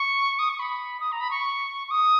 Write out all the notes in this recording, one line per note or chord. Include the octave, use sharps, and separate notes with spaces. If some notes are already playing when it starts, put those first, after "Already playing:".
Already playing: C#6
D#6
C#6
B5
D#6
A#5
B5
C#6
C#6
D#6